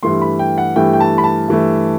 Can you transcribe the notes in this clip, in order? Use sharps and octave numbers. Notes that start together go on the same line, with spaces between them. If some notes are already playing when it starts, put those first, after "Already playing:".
G2 E3 A3 C6
B5
G5
F#5
G2 E3 A3 G5
G5
A5
B5
A5
G2 E3 A3